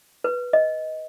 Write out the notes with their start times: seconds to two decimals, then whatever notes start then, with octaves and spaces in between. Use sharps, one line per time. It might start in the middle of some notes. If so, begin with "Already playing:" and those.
0.24 B4
0.53 D#5